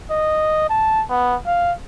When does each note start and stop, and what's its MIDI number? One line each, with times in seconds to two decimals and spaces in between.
0.11 0.69 75
0.70 1.03 81
1.10 1.35 59
1.46 1.72 77